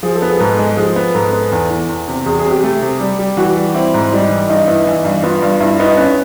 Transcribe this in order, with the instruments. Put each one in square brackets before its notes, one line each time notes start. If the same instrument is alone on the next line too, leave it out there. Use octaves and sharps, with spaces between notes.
[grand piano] F3 [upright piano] G#4
[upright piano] A4
[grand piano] B3
[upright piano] G#4
[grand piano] G#2 [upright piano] A4
[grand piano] G#3
[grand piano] F3 [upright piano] G#4
[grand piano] B3
[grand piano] G#2 [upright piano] A4
[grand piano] B3
E2
E3
E2
C3
[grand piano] E2 [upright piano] G#4
[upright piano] G#4
[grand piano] C3
[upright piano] G4
[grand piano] A3
C3
G3
G3
[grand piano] E3 [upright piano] F#4
[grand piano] G3
[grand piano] C4 [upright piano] E4
[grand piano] G#2
[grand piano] G3 [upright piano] D#4
[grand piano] E3
[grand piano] G2 [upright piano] D#4
[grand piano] B3 [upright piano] E4
[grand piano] E3
G2
[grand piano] B3 [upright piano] F4
[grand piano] G2
[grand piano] G2 [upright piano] E4
[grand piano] B3 [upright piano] D#4
[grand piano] B3 [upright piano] C#4